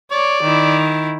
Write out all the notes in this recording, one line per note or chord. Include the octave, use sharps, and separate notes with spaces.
C#5 D5
D#3 E4